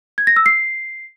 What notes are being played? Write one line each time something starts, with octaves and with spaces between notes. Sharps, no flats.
G#6
A#6
E6
C7